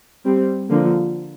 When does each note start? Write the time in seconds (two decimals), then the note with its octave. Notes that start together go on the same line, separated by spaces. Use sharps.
0.25 G3 C4
0.70 D3 F3 A#3